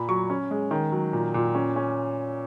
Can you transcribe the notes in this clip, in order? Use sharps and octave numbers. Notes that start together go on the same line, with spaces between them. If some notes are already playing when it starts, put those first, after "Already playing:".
Already playing: A#2 B5
F#3 C#6
C#4
G#3
D#3
F#3
A#2
A#2
C#4
C#4